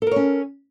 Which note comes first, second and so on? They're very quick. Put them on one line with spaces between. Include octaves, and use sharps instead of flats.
A4 A#4 C#5 C#4